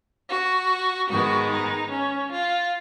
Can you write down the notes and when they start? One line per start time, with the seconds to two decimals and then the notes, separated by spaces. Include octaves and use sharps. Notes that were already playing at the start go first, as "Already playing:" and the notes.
0.28 F#4
1.09 G#2 D#3 G#3 B3 F#4
1.51 D#4
1.91 C#4
2.31 F4